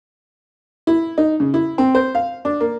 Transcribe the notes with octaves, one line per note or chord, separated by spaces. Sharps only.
E4
D#4
C#3
E4
C4
C5
F5
D4
A#3